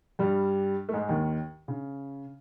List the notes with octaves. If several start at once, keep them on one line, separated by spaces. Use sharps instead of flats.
G2 G3
A3
G#2 G#3
D#2 D#3
C#3